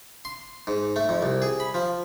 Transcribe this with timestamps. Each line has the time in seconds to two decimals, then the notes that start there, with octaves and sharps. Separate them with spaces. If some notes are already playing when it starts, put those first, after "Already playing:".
0.25 C6
0.67 G#2
0.96 A3
1.09 F2
1.22 C2
1.42 G#4
1.60 B5
1.74 F3